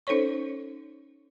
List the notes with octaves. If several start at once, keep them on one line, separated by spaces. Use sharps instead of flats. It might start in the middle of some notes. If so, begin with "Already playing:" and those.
C#4 D#4 A4 C5 C#5 C#6